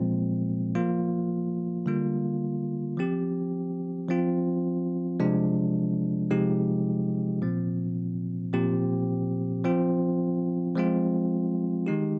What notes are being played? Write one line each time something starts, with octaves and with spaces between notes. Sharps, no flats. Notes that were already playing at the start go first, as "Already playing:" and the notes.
Already playing: A#2 F3 G#3 C4
F3 A#3 F4
D3 G3 A#3 F4
F3 C4 G4
F3 C4 F4
C3 F3 G#3 D4
C3 F3 G#3 D#4 G4
A#2 F3 C4
A#2 F3 C4 G4
F3 C4 F4
F3 G#3 C4 F4
D#3 G#3 D#4 G4